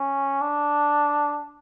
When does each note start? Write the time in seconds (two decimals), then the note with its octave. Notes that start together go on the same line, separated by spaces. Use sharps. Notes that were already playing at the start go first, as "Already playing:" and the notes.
Already playing: C#4
0.41 D4